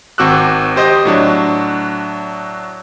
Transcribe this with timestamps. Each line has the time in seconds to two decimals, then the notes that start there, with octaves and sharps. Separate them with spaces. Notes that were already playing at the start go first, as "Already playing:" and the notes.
0.18 G#1 C4 F#4 D6 E6 F#6
0.76 G4 C5 D#5 D#6
1.05 A2 F#3 D4